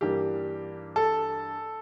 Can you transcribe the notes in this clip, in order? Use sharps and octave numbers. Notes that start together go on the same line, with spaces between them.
G2 E3 G3 A#3 G4
A4